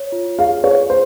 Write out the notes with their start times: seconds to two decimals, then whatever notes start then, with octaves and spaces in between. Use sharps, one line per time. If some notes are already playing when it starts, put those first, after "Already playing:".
Already playing: C#5
0.12 F4
0.39 G#4 F5
0.64 G#4 C#5
0.90 C5